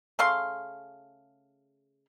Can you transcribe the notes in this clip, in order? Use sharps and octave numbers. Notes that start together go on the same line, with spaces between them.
C#3 A3 F5 C6